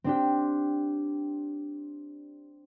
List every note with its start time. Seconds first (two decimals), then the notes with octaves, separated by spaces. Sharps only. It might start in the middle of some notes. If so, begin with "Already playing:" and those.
0.04 C4 D4 G4